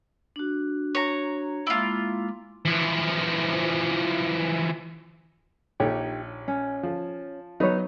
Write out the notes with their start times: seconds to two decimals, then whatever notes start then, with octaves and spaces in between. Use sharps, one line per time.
0.36 D4 F#4
0.95 C#5 A#5
1.67 G#3 A#3 E4 F4 D6
2.65 E3 F3
5.80 A#1 D#4 G4 C#5
6.48 C#4
6.83 F3
7.60 F#3 B3 D#4 C#5